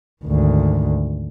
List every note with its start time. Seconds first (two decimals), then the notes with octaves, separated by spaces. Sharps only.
0.23 G#1 D2